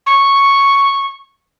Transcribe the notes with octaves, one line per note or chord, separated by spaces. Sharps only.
C#6